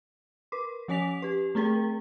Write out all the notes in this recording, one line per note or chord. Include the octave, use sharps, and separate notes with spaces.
A#4 B4 D6
F3 C#4 C#5 G#5 B6 F7
G4 B4
A3 C4 G#4 A#4 G5